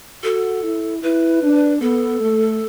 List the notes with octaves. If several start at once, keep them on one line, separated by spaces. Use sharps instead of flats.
F#4 A4
E4
E4 B4
D4
B3 A4
A3